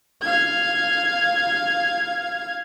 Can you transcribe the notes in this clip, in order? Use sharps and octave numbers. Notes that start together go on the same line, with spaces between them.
F5 G#6